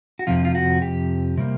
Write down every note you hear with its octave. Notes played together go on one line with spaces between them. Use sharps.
F#4
F2 C3 F3 F4
F4
F#4
G4
C3 G3 A#3